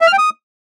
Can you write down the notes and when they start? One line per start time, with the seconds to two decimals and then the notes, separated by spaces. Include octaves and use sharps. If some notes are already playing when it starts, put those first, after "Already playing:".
0.01 E5
0.07 F6
0.13 G5
0.18 D#6